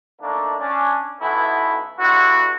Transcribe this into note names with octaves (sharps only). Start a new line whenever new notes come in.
D#3 A3 A#3 D4
C#4 D4
B1 E3 B3 C#4 E4 A4
G2 D3 E4 F#4